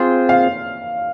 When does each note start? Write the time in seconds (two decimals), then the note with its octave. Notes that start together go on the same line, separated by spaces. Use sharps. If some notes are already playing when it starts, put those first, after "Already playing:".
Already playing: C4 F4 G#4 C5
0.29 F5